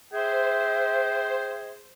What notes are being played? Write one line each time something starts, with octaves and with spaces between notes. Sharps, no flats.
G#4 C5 E5 G5